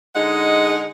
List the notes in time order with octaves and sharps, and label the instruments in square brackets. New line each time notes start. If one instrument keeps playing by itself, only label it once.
[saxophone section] D3 G#3 D#4 F#5